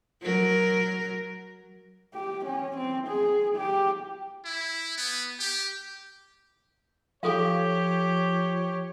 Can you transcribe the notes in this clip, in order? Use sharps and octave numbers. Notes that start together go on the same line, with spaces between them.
F#3 A#4
G4
C#4
C4
G#4
G4
E4
B3
G4
F3 G4 A4 C#5 F5